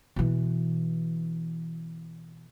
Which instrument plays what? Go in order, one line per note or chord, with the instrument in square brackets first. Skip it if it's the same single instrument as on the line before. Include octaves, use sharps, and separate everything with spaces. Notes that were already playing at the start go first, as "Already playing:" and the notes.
[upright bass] B2 E3